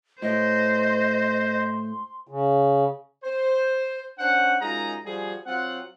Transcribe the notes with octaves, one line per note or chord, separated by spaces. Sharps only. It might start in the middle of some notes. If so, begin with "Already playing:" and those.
A2 C5 D#5
C6
C#3
C5
C#4 D4 C5 F#5
F#2 G#3 D#4 F4 G#4 A#5
F3 G3 F#4 G#4
F#3 C4 F4 F#5